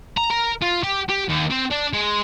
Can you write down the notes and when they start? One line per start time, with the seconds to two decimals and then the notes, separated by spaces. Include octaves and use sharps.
0.18 A#5
0.31 A#4
0.62 F4
0.83 G4
1.09 G4
1.29 D#2
1.50 C4
1.71 D4
1.93 G#3